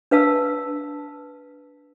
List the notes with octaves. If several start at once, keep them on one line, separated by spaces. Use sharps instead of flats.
D4 B4 F5 A5 E6